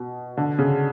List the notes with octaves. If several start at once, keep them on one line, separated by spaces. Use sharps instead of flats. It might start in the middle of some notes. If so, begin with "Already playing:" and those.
Already playing: B2
D3
C#3